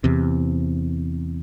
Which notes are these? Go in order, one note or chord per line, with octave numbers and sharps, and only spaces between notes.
E2 C3